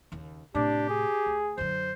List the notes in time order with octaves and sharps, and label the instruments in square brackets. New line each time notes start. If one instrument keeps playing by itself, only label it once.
[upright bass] D#2 C#3
[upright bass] A2 C3 [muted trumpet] D4 [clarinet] G4
[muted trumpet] G#4
[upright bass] D2
[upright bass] F#2 D3 [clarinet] C5